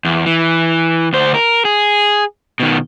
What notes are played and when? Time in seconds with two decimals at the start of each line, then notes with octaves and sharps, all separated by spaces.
0.05 E2
0.26 E3
1.13 D2 C5
1.34 A#4
1.65 G#4
2.60 B2 D#3